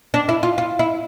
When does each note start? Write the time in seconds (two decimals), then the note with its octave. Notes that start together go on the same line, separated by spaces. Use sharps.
0.14 D4
0.29 E4
0.43 F4
0.58 F4
0.79 E4